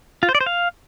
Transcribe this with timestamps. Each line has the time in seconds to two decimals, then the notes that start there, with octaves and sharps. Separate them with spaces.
0.23 F4
0.29 C5
0.35 D5
0.41 C5
0.46 F5